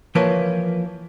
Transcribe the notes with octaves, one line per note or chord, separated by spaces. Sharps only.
E3 F3 A#3 A#4 B4 C#5